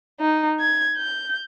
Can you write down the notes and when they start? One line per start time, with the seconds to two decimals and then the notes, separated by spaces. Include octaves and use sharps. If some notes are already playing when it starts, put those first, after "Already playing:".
0.20 D#4
0.60 G#6
0.97 G6